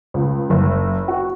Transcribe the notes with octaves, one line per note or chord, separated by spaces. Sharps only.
C#2
F#1
F#4